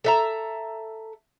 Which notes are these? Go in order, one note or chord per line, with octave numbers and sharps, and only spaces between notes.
A4 E5 A#5